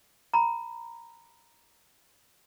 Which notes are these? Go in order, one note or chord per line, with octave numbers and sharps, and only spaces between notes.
A#5 B5